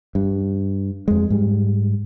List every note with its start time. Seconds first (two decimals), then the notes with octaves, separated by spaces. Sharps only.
0.15 G2
1.08 F2 G#3
1.30 G#2 G3